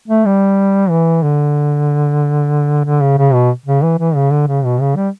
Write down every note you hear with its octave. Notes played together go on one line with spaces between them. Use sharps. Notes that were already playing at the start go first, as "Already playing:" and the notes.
A3
G3
E3
D3
D3
C#3
C#3
B2
C#3
E3
E3
C#3
D3
C#3
B2
C#3
G3